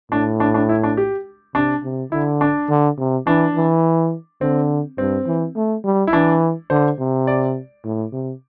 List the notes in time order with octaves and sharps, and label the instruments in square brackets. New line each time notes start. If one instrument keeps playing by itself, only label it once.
[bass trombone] A2 [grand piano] D4
[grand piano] D4
D4
E4
D4
G4
[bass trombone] C3 [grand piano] D4
[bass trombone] C3
[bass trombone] D3 [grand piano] E4
[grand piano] D4
[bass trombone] D3
C3
[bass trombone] E3 [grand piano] D4
[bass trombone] E3
[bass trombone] D3 [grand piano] C4
[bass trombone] G2 [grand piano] C4
[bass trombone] E3
A3
G3
[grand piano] E4
[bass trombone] E3 [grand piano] D4
[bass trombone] D3 [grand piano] C5
[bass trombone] C3
[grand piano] D5
[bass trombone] A2
C3